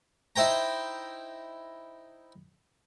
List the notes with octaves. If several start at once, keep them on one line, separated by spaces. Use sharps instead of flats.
D#4 E4 C5 G5 A#5